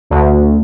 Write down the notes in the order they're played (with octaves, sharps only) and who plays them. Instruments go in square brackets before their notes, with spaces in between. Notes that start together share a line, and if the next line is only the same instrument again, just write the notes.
[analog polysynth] D2